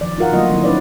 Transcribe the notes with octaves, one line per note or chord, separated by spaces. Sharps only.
D#3 F3 D5
F4 F#4 A#4 F5 F#5
D3 F#3 A3 A#3 F4 D#5
D#3 F#3 C4 E4
C#4 D#4 B4 C#5 D5